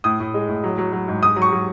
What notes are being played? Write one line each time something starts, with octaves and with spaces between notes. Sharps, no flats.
A2 D#6
A2
G#3
A2
F#3
F#3
F#3
G#2
G#2 D#6
F#3
C#6
F#3